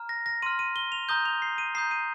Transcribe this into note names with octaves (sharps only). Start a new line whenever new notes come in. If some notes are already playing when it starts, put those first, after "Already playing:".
Already playing: A#5 F6
A#6
A#6
C6 F6 D#7
D#7
G7
F7
A#5 D#6 G6 G7
F7
C7
D#7
A#5 D#6 G6 C7
D#7